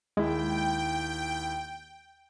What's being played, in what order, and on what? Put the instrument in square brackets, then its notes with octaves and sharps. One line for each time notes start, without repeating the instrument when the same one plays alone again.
[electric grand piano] D#2 E4 [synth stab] G#3 [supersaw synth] G5